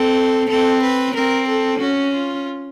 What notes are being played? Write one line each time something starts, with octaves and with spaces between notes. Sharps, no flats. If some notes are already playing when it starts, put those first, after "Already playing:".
Already playing: C4 A4
C4 A4
B4
C4 A#4
A4
C#4 F#4
F4